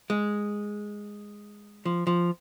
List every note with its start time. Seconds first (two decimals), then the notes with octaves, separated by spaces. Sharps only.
0.10 G#3
1.85 F3
2.07 F3